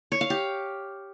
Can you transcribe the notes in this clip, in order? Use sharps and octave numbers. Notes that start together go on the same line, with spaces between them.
C#5
F5
G4